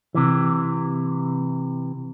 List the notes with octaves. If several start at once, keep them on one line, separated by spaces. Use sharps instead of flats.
C3 E3